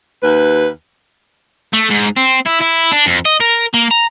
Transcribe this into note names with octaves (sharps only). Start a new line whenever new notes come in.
D#2 B4
A3
G#2
C4
E4
E4
D4
F2
D#5
A#4
A#3
A#5